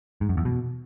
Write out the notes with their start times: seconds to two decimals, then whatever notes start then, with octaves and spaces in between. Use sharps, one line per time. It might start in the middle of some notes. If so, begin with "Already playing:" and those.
0.21 G#2
0.29 F#2
0.37 E2
0.45 B2